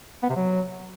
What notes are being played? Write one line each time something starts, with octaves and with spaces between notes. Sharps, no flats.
B3
C3
F#3